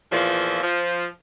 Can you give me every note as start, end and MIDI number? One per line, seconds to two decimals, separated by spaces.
0.12 0.60 40
0.12 0.60 46
0.12 0.60 52
0.12 0.60 53
0.63 1.05 53